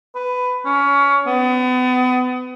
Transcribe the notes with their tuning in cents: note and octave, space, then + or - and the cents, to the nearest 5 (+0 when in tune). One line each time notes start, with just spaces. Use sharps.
B4 +15
C#4 +20
B3 +35